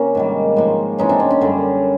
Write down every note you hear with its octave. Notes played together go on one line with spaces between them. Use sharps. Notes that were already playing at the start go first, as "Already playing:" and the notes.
Already playing: C3 A#3 C#4
G#2 D#3 G3
G#2 F3 A#3
C3 E3 G#3 C#4 D#4
C4 D4
C#4
C#4
F#2 D3 G3 A#3